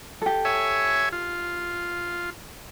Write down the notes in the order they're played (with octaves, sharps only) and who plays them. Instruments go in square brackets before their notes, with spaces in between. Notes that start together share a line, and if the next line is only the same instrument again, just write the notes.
[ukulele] G4 A4
[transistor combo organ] C#5 E5 G#5
F4